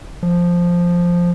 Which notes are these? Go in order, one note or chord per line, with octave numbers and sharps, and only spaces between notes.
F3